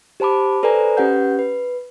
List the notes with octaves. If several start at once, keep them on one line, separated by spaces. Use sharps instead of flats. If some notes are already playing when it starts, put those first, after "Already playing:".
G4 C5 A5 B5 D6
A4 B4 C5 D5 G#5 A#5
C#4 G4 B4 F#5 G6
B4